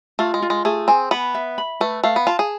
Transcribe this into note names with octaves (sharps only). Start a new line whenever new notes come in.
A3 F4
G#3
F4
G#3
A3 G#4
C4 G#5
B3 B5
E5
B5
A3 B4
A3 F5
B3
F4 A5
G#4